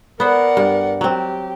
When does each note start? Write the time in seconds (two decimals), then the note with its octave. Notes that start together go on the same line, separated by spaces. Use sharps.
0.20 B3 A#4 C5 D5 F#5
0.57 G2
1.01 F#3 C4 G4